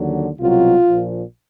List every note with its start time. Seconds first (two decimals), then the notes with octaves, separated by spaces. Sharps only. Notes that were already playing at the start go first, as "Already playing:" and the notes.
Already playing: D#2 D3 F#3
0.39 C2 B2 F#3 F4
0.86 A#1 A#2 F3